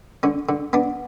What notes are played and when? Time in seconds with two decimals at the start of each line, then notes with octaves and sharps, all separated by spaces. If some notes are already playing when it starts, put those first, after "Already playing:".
0.23 D3 C#4
0.49 D3
0.73 B3 D4